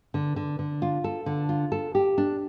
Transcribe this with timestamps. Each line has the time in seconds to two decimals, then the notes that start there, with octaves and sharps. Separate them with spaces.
0.14 D3
0.36 D3
0.59 D3
0.82 F4
1.04 A4
1.26 D3
1.49 F4
1.72 A4
1.95 G4
2.18 D4